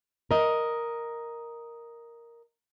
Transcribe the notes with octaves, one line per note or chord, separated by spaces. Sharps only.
A#4 D#5